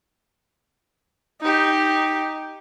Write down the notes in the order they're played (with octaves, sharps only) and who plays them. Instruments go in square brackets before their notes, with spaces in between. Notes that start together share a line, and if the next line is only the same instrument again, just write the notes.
[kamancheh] D#4 G4